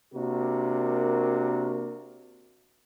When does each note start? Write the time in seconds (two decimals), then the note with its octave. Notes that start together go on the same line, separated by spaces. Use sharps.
0.14 C3 A#3 D4 F#4 A#4